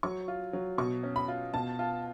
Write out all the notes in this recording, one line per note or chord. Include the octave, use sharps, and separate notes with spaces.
F#3 C#6
F4
F#3
B2 C#6
C#4
B5
F4
B2 A5
F4